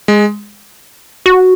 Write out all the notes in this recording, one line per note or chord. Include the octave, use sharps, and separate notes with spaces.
G#3
F#4